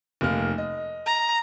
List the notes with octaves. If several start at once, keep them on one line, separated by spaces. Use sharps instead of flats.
F1 A#3 F6
D#5
A#5